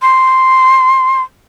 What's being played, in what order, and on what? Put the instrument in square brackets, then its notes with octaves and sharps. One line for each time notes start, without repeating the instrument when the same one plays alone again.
[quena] C6